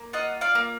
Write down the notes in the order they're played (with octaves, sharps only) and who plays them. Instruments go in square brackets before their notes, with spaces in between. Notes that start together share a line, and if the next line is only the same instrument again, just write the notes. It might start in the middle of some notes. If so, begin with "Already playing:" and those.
Already playing: [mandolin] A#3
F4 D#5 F#5
D5 F5
A#3